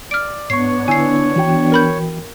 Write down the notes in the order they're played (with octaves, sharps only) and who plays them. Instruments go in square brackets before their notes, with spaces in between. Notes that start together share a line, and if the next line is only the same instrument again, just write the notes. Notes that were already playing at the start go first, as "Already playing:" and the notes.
[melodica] D5 [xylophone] F6 D7
[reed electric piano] G#2 C#6 [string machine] B3 D4 [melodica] C#5 [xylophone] C7
[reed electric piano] D3 E4 E6 [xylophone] G#5 C7
[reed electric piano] E3 F#4 G5
[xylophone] A#4 B5 G6